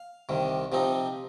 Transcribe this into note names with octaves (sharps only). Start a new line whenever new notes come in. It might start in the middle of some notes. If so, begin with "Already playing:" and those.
Already playing: F5
C2 C3 D#3
C3 F3 C4 D#4